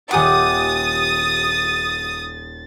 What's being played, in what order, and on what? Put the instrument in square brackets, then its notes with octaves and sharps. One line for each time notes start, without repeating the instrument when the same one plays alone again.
[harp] D#1 G4 F#5 [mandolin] G#5 D6 [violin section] D#6 [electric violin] A6